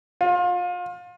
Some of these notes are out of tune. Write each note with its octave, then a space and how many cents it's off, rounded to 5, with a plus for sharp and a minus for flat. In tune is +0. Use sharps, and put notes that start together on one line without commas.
F4 +30